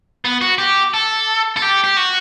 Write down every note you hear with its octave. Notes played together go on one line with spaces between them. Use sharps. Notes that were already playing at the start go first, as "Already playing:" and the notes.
B3
F#4
G4
A4
A4
G4
G4
F#4